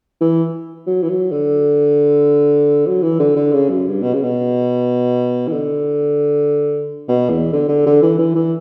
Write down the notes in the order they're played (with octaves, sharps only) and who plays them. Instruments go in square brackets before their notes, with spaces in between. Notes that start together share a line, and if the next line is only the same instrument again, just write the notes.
[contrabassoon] E3
F#3
E3
F#3
D3
F#3
E3
D3
D3
C#3
F#2
G2
B2
C#3
B2
E3
D3
B2
E2
D3
D3
D3
E3
E3
E3